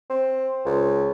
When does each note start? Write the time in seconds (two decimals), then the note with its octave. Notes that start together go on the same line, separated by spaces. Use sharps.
0.10 C4
0.65 C#2